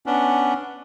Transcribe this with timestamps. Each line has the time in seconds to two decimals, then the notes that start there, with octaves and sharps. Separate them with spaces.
0.06 B3 C#4 D4